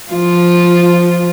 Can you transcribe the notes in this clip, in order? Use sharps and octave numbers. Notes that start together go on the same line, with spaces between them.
F3 F4